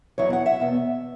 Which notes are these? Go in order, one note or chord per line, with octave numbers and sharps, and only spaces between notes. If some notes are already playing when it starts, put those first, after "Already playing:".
E2 B2 F#3 B3 E4 C#5
F#5
E5
E2 B2 B3